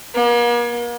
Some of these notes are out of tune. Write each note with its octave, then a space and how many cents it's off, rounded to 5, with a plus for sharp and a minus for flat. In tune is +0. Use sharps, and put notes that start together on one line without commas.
A#3 +40